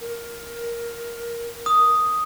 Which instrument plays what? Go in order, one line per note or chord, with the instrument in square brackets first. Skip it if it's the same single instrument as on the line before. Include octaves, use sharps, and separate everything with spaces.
[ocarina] A#4
[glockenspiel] D#6